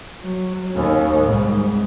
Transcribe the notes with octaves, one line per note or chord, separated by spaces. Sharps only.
F#3
D#2 C#4
C2 G#2